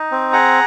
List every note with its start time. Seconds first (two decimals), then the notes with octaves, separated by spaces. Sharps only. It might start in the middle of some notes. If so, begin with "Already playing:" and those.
Already playing: D#4
0.11 C4
0.33 G#4 F#5 A#5